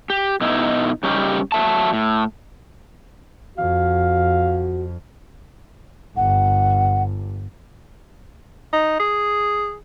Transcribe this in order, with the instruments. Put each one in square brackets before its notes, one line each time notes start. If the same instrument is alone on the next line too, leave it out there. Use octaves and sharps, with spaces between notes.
[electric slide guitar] G4
B2 D#4 E4
C#3 G3 C#4 D#4 G4
F#3 E5 A5
A2
[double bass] F2 [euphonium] F#4 [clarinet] F5
[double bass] G1 [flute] F#5
[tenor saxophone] D#4
G#4